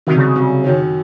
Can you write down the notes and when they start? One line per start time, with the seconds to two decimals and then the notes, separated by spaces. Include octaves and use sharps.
0.07 C2 C3 D#3 F#3
0.16 C#3
0.26 C#3
0.35 C2 C3 F#3
0.64 F#2 D#3 F#3